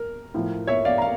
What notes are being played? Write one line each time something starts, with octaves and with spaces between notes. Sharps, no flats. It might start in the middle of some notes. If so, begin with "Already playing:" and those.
Already playing: A#4
A2 F3
C#5 E5
D5 F5
A#5
F5